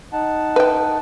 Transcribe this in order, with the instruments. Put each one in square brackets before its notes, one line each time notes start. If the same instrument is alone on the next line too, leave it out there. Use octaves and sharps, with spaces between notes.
[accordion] D#4 F#5 A5
[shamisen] B4 G5